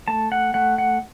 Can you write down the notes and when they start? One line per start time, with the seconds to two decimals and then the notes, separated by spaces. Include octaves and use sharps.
0.08 A3 A5
0.32 F#5
0.54 A3 F#5
0.78 F#5